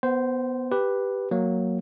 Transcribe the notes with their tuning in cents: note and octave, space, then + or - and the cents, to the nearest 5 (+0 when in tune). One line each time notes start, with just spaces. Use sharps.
B3 +0 C5 -10 F#5 +45
G4 +0 B4 +0
F#3 +0 A#3 +0